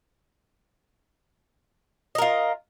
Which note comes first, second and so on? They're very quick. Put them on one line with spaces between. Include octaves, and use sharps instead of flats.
D#5 A#4 F4